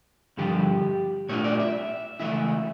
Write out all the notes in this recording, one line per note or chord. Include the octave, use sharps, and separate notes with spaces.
G2 D3 F3 G4
A#2 A3 D4 F4 C#5
D5
E5
C#2 C#3 E3 A3 E4 E5